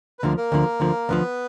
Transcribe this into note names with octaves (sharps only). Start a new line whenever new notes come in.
B4
D2 D3 F3 A#3 A#4
A#3 A#4
D2 D3 F3
D2 D3 F3
D2 D3 F3 B3 B4